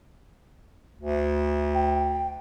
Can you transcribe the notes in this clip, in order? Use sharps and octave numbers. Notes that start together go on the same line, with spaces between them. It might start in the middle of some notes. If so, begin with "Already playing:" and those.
D2
G5